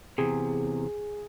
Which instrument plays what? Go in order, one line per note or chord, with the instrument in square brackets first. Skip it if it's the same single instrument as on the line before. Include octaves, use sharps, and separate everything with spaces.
[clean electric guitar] E2 C3 [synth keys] G#4